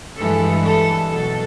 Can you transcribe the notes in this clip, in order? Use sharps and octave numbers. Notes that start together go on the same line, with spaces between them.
G2 E3 G#3 A4
A4
B2 F#3 A4